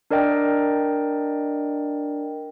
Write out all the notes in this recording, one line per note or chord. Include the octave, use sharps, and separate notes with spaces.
D4 A#4 D5 D#5 G5